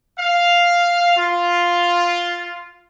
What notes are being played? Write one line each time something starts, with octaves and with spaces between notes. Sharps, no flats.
F5
F4